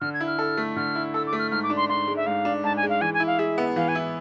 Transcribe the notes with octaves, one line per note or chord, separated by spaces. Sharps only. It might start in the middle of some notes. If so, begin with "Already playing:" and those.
D3 F6
G#6
E4
F6
A4
A3
D3 F6
E4
A4 E6
D6
A3
F6
G#2 F6
D6
D4
C6
G#2 C6
G#3
E5
G#2 F5
D4
G#2 A5
G#5
G#3
F5
E3 G#5
G#5
E4
F5
G#4 E5
B3
E3 F5
G#5
E4